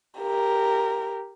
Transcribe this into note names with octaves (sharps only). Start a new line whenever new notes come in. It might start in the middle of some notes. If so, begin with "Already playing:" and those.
G4 A#4